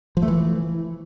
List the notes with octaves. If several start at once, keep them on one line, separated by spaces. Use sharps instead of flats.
F3
A3
E3